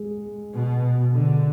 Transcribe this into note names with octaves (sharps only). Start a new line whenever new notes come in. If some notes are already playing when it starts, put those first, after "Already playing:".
Already playing: G#3
B2
D3